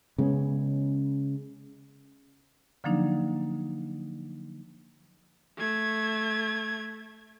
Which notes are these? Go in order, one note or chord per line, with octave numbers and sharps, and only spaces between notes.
C#3 G#3 B3 C#4
D3 F3 F#3 A#3 D4 D#4
A3 G#6